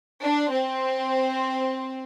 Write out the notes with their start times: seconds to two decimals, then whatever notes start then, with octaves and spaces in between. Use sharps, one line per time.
0.24 D4
0.52 C4